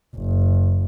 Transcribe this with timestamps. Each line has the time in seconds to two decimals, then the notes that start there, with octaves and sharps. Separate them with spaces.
0.17 F#1